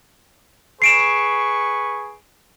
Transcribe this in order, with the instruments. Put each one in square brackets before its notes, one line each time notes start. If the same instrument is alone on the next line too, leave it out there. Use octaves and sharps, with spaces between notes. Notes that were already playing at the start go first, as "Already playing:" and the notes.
[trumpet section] G#4 B4 C#6 [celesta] C7 D7 E7